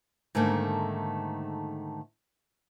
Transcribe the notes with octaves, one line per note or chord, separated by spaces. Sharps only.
G#2 D3 D#3 A3 A#3